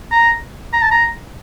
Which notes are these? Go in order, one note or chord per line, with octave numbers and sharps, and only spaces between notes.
A#5
A#5
A5
A#5